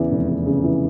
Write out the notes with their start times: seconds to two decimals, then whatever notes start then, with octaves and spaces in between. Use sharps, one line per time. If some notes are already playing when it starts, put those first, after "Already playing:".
Already playing: E2 C#3 E3
0.11 F1
0.29 E2
0.46 C#3
0.64 E3